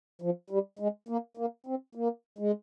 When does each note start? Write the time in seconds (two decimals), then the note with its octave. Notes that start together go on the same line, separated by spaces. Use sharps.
0.22 F3
0.50 G3
0.79 G#3
1.09 A#3
1.37 A#3
1.66 C4
1.95 A#3
2.38 G#3